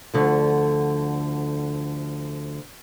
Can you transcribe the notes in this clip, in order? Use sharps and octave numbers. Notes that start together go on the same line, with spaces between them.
D2 D3 F3